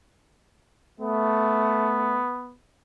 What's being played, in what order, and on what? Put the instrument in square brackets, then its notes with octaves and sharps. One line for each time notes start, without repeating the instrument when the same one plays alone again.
[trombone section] A3 [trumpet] B3